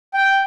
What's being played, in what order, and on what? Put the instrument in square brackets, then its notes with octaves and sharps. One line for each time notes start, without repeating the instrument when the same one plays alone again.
[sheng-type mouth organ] G5